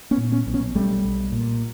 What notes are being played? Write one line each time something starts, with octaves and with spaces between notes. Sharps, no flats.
B3 C#4
A#2
B3 C#4
B1
B3 C#4
B1 G3 A3
B1
A#2